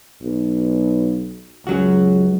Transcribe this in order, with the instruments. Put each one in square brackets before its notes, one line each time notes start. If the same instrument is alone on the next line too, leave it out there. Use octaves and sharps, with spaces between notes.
[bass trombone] B1
[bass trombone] C#2 [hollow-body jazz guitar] F#2 F#3 F#4